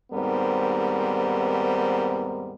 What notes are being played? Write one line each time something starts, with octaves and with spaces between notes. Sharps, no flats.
D#2 G#2 G3 B3 C4 A#4